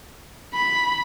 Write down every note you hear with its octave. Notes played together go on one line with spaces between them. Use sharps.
B5